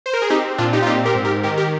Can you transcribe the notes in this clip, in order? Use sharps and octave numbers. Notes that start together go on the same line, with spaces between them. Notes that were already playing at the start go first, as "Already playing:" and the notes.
C5
A#4
G#4
C4 D#4 G4
A#2 D4 F4
D#4 G4
F4
C4 D#4 G4
G4 A#4
G#2
G4 A#4
D#3 G4 A#4
G4 A#4